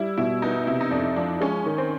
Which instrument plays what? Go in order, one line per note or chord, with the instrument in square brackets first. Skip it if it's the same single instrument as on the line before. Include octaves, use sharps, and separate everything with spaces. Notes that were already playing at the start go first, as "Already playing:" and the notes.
Already playing: [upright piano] G3 [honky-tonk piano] E4
[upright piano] B2 [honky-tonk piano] E4
[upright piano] B3 [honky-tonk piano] D#4
[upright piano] C3 [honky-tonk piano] E4
[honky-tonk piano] D#4
[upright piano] F2 [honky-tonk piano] D4
[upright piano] F3 [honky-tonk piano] D4
[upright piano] G#3 [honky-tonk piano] C#4
[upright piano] D#3
[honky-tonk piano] C4